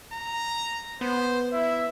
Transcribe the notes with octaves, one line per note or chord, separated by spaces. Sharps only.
A#5
B3 C5
E4 E5